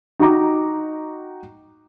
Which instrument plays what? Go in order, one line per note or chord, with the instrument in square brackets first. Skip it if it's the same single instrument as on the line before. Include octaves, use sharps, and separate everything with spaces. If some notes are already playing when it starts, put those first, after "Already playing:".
[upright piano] D#4 F#4 D#5 G5 A#5 D6